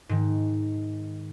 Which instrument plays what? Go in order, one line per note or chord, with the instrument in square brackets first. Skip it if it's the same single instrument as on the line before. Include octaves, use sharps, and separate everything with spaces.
[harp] G#2 D#3